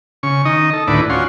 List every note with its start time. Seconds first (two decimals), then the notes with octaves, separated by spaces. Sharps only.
0.23 C#3 C#6
0.45 D#3 D#4 D#5
0.73 A4
0.87 D2 A2 D#3 E4 B4 D5
1.10 C#4 F4 F#4 C6